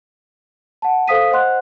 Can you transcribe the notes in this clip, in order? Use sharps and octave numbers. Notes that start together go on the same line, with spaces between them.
F#5 A5
A4 C5 F5 D#6 B6 D#7
C5 D#5 F#5 C6 F#6